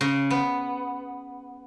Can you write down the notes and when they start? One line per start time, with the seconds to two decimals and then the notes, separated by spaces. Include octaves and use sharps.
0.01 C#3
0.30 B3